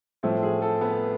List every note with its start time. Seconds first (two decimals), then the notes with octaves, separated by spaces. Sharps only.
0.23 A2 F3 A3 C4
0.43 G#4
0.62 A4
0.81 B3 B4